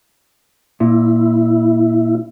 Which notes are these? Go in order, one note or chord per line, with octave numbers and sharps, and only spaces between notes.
A#2 E4